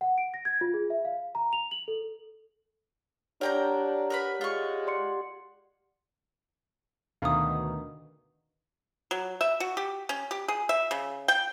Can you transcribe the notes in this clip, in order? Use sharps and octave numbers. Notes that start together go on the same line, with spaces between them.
F#5
D7
A#6
G#6
F4
G#4
E5
F5
A#5
F7
F#7
A4
D4 G4 A#4 C#5 D5 F#5 G5 A#5
A#4 B4 B5
G#3 F4 C#6
D5 C6 C#7
D2 B2 D#3 F5 D#6
F#3
E5
F#4
G4
C#4
G4
G#4
E5
C#3
G5